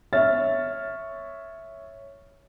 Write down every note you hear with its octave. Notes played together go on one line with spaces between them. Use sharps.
C#5 E5 F6 A6